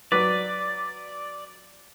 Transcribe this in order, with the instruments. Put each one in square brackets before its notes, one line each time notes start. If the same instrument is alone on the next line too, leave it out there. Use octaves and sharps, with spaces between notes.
[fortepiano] F#3 B4 D6 [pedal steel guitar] D5